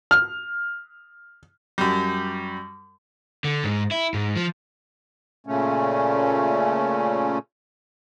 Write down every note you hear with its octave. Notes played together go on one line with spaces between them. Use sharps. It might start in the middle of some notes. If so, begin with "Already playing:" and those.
F6
F#2 G3
D3
G#2
E4
G#2
F3
A#2 C#3 A3 C#4